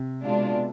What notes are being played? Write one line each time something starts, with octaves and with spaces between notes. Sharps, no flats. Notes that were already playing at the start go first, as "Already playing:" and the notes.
Already playing: C3
B2 G#3 D4 F4